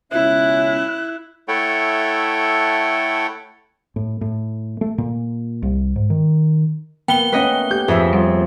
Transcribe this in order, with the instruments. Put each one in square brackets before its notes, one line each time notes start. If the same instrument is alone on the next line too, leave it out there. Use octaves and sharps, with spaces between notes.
[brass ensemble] C#2 B2 C#4 [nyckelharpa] E4 [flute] E5 [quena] F#6
[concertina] A3 E4 A4 C#5 F#5 G5
[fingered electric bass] A2
A2
A3
A#2
C2
G#2
D#3
[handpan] A#3 [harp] B3 [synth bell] G5 G7
[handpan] A3 C#4 [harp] B4 D#5 F#5
[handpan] A3 G4 [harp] G6
[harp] F2 [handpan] G#4 B4 E5
[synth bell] G3